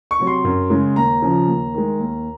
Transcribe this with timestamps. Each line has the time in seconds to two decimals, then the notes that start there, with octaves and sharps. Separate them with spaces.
0.11 C#6
0.19 C3 F#3
0.27 C6
0.44 F#2
0.70 C#3 G#3
0.96 D#2 A#5
1.22 C#3 F3
1.47 D#2
1.74 D#3 G#3
1.99 D#2